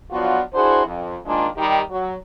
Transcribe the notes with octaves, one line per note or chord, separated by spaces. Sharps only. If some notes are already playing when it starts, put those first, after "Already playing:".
F3 F#3 B3 D4 F4 F#4
D4 E4 F#4 G#4 C5
F2
G#2 D#3 G#3 A#3 D4 F4
D#3 G3 D#4 G4
F#3